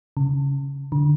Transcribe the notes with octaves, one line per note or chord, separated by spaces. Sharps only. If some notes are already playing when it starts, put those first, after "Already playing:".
C#3
D3